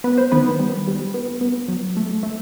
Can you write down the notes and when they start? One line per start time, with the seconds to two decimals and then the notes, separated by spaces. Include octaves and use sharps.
0.04 B3 B4
0.18 C5
0.32 D#3 B3 B4
0.59 G3
0.87 G3
1.14 B3
1.41 B3
1.68 F#3
1.97 A3
2.23 A3